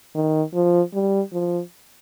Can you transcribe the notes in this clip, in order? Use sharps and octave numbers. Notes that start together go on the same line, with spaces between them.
D#3
F3
G3
F3